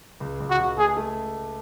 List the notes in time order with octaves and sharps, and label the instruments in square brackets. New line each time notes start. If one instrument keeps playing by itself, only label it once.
[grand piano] C#2
C#2
[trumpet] F#4
[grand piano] C#2
[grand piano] A3 [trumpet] G#4
[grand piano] A3